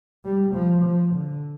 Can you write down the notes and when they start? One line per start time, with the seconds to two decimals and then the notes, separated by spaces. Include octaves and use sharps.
0.25 G3
0.54 F3
0.84 F3
1.14 D3